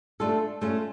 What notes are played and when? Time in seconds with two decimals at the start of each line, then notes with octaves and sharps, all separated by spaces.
0.20 A3 D4 F4 A4
0.62 A3 C#4 F4